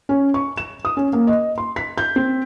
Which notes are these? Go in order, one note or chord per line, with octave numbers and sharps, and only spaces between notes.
C#4
C#6
E7
D#6
C#4
A#3
D#5
C6
B6
G6
C4